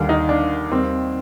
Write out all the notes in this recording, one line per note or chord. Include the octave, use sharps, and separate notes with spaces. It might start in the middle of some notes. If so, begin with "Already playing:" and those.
Already playing: D#2 D3 G3
D#4
D4
D#2 D#3 G3 C4